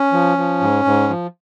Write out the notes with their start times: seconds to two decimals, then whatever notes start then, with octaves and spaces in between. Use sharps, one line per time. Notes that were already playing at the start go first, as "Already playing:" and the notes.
Already playing: C#4
0.13 F3
0.37 F3
0.61 G#2
0.85 G#2
1.09 F3